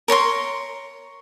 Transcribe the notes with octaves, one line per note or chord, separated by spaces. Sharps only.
A#4 C#5 A#5 C6